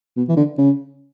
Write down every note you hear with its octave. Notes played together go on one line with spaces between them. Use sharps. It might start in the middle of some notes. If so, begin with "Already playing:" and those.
B2
E3
D3
C#3